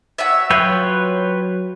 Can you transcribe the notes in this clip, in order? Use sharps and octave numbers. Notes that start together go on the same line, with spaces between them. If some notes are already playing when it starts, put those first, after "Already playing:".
F#4 C#5 E5
F#3 F4 B4 C#5 G5